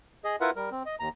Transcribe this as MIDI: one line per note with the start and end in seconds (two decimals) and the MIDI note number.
0.24 0.36 68
0.24 0.36 75
0.41 0.50 64
0.41 0.50 65
0.41 0.50 70
0.41 0.50 71
0.41 0.50 76
0.41 0.50 78
0.56 0.70 55
0.56 0.70 70
0.71 0.83 60
0.86 0.95 75
1.00 1.09 39
1.00 1.09 82